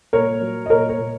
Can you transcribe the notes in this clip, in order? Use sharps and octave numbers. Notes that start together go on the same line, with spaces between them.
A#2 A#4 C#5
F#3
D#5
A#2 A#4 C#5
A#4 C#5
A#2